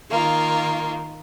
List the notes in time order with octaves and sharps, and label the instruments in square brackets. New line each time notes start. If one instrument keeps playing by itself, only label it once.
[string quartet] D#3 A#3 F4